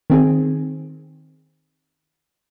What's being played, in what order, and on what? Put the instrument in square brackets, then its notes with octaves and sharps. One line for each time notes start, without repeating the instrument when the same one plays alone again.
[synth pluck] D#3 C4 G#4